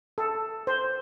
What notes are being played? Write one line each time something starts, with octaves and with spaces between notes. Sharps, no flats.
A4
C5